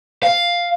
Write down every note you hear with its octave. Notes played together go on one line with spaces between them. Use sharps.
F5